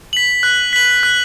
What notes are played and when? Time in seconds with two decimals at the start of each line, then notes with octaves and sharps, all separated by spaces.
0.13 B6 F#7
0.43 F#6
0.73 B6 F#7
1.03 F#6